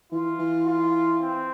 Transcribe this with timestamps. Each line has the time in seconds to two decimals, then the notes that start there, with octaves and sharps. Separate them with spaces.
0.12 E3 F4
0.39 E3
0.66 F4
1.20 C4